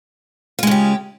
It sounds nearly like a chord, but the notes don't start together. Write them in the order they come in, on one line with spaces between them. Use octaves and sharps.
F4 G#3 C#3 G4